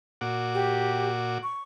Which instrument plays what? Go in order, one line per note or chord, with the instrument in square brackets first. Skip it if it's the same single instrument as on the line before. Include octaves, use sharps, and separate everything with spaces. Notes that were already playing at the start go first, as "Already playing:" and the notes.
[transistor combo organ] A#2 F#4 D6
[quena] G4
C#6